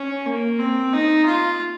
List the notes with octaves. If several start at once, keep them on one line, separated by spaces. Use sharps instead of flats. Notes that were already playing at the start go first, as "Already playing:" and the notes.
Already playing: C#4
A#3
C4
D#4
F4